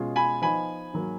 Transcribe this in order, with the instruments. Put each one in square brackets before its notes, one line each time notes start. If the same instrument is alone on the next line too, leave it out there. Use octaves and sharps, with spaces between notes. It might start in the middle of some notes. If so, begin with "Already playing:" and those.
Already playing: [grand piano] B2 G#3 C#4 F4 G#4
[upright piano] G#5 B5
[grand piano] F3 B3 D#4 [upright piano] G#5 B5
[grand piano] G#2 F#3 A#3